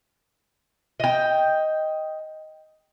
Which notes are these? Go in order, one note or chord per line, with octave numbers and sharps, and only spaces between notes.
D#5 G5